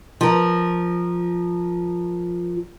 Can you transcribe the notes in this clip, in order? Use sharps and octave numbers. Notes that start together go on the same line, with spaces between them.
F3 A#4